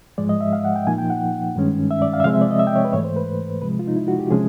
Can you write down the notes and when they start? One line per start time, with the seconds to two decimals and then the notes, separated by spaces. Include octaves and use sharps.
0.18 G#2 F3 G#3 D5
0.29 D#5
0.41 E5
0.53 F5
0.65 F#5
0.76 G5
0.87 A#2 F3 A#3 D#4 G#5
0.98 G5
1.10 F#5
1.56 G2 D#3 G#3 C#4
1.91 E5
2.02 D5
2.13 F5
2.20 E5
2.24 C3 F3 G#3 C4 F5
2.33 E5
2.41 D5
2.51 D#5
2.59 E5
2.67 G5
2.76 C#5
2.85 B4
2.93 G#2 E3 A3 C#5
3.04 C5
3.16 B4
3.62 C3 F3 G#3 B4
3.79 F4
3.88 D#4
3.96 E4
4.08 F#4
4.19 G4
4.31 C3 F3 G#3 C#4 G#4